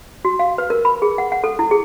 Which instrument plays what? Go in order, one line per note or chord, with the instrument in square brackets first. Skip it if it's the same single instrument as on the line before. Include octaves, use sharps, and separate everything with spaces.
[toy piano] F#4
F5
B4
A#4
B5
G#4
F#5
F#5
A4
E4
G#4